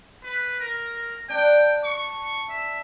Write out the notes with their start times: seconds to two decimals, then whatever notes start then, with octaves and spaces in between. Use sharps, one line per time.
0.23 B4
0.60 A#4
1.29 D4 G5
1.84 C#6
2.49 E5